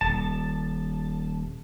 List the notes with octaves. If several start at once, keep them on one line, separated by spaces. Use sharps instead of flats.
D#1 A5